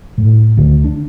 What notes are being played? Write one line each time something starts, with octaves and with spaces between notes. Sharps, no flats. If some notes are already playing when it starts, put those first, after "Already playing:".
A2
D2
D4